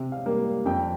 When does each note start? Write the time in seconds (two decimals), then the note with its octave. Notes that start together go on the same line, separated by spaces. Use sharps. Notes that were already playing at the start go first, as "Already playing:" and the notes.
Already playing: C3
0.12 F5
0.26 G3 A#3
0.65 F2 G5